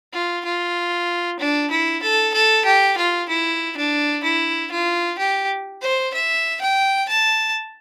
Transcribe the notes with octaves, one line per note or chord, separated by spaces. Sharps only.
F4
F4
D4
E4
A4
A4
G4
F4
E4
D4
E4
F4
G4
C5
E5
G5
A5